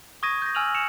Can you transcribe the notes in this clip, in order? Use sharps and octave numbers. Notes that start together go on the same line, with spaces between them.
C#6 D#6 G#6 A#6 D#7
G6 A#6
G#5 E6 F6 D#7 F7 F#7
C#7 E7 F7